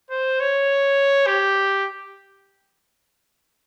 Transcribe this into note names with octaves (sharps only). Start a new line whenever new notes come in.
C5
C#5
G4